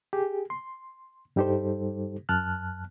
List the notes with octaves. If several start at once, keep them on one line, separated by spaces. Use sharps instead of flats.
G4 G#4
C6
G2 G3 D#4 G4 A4 C5
F#2 A5 F6 F#6